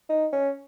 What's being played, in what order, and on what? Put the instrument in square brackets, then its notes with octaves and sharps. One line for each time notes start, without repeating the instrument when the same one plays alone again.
[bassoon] D#4
C#4